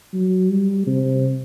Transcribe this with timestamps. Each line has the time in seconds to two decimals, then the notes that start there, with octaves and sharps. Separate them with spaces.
0.13 F#3
0.50 G3
0.87 C3